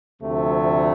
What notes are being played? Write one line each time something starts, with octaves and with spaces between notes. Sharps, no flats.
D2 C3 F3 A3